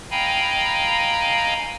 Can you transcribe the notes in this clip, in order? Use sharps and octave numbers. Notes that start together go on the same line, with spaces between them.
D#5 F5 G5 G#5 A#5 B5